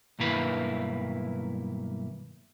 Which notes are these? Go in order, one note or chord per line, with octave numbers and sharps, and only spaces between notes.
B1 G2 D#3 A#3 E4 B4